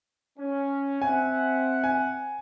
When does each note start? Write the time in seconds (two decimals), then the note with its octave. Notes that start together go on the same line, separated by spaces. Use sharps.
0.38 C#4
1.02 C4 E5 F#5 G#5
1.84 G#5